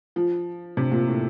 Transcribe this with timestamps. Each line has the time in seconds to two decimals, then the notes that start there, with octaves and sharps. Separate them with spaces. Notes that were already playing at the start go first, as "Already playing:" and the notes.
0.16 F3
0.77 C3
0.92 A#2
1.08 A2